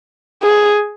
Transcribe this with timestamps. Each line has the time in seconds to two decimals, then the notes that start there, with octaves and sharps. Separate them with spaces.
0.43 G#4